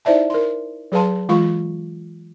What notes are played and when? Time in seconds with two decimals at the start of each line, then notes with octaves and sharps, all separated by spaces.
0.05 D#4 E4 C5 D5 E5 A5
0.30 A#4 C6
0.92 F#3 G#4 B4 F5 A5 C6
1.29 E3 G#3 F4 F5 C#6